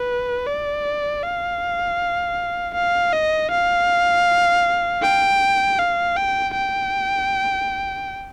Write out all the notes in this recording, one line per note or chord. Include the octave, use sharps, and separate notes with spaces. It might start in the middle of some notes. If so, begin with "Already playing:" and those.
Already playing: B4
D5
F5
F5
D#5
F5
G5
F5
G5
G5